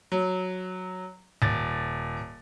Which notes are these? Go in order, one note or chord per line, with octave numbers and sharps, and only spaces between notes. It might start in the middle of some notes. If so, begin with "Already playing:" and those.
F#3
D#1 A6